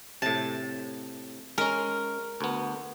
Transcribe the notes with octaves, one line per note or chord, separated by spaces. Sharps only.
A2 C3 A5
G#3 C#4 A#4
D2 B3